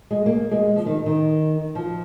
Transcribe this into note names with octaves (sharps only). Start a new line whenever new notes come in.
G#3
A#3
G#3
F3
D#3
D#3
F3